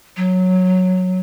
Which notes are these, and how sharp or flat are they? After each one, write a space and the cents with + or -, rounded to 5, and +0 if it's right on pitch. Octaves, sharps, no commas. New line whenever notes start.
F#3 -5